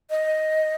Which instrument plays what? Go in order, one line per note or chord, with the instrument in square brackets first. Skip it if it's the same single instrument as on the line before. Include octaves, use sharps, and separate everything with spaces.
[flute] D#5